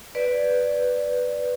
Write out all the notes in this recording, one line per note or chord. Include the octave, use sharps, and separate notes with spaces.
B4 D5